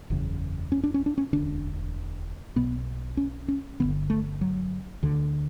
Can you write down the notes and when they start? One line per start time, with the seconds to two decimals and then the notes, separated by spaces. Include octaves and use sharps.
0.10 F#1 E2 C#3
0.72 C#4
0.83 D4
0.94 C#4
1.06 D4
1.18 C#4
1.33 E1 D2 D3 D4
2.56 B1 B2 B3
3.17 C#4
3.48 C#4
3.80 G1 G2 D3 B3
4.10 A3
4.41 F#3
5.03 D2 D3